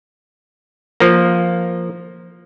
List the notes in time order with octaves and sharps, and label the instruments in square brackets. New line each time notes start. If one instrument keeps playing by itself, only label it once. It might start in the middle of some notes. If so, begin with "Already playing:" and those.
[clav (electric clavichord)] F3 A#3